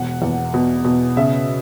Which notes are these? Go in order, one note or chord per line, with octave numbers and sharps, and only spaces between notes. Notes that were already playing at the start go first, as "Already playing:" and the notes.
Already playing: E1 F#5
E2
B2
B2
C#3 E5